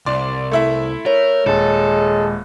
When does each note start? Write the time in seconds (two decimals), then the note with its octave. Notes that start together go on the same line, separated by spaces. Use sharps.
0.06 C2 D5 C6
0.51 A3 E4 E5
1.06 A#4 C#5
1.46 D#1 G#3 A4